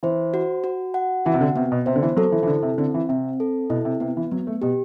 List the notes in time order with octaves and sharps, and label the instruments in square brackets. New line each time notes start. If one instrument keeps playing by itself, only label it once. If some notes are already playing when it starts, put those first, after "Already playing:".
[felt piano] E3 [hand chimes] C5
[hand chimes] F#4
F#4
F#5
[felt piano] E3 [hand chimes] F#4
[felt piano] C3
D3
[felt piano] C3 [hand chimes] B3
[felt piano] B2
[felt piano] C3 [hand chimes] C5
[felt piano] D3
E3
[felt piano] F#3 [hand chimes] A4
[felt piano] E3
E3
[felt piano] D3 [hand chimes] E4
[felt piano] C3
[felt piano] D3 [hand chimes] C4
[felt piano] E3
[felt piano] C3 [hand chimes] C4
[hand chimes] A4
[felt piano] B2 [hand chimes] E4
[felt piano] C3
[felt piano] C3 [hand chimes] B3
[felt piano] E3
[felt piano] F#3 [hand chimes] B3
[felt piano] A3
[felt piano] B2 [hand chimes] G4